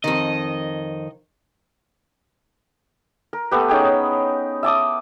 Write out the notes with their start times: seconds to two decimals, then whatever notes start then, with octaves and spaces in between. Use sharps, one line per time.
0.04 F2 D#3 D#5
3.33 A#4
3.51 A3 B3 G4 B4
3.69 C#4 D#4 G#4 G5
4.63 E5 A5 D6 D#6